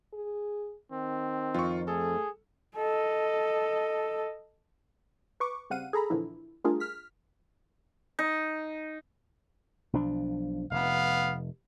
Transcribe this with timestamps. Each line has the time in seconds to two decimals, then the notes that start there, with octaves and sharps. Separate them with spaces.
0.13 G#4
0.92 D#3 C4
1.54 F2 F4 C#6
1.88 A3 G#4 A4
2.77 A4 D#5
5.40 B4 C#6 D6
5.70 C#3 G3 C4 F5 F#5 D#7
5.93 G#4 A4 A#5 B5
6.10 A#2 D3 E3 F3 E4
6.64 G3 A3 D4 F4 G#4 A#4
6.80 F6 B6
8.19 D#4
9.93 B1 F3 D4
10.71 F1 B3 F5